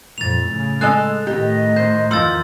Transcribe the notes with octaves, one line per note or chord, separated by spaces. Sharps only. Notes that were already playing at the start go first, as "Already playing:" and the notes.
F2 A#2 A6 F7
A2 C#3
G#3 A4 D#5 F#6
A2 D#3 G4 D#5
C5 G6
E2 D#3 F3 C6 E6 A6